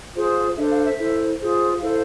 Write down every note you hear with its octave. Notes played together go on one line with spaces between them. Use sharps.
F4 G#4 C5
D4 A4 C5 E5
F5
E5
E4 A4 C5
F4 G#4 C5
E4 A4 C5 F5